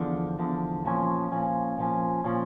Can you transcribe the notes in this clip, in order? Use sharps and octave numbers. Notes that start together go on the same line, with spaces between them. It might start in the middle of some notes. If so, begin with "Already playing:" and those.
Already playing: E2 D3 F3
E2 D3 F3
A#2 F3 C#4
A#2 F3 C#4
A#2 F3 C#4
A#2 F3 C#4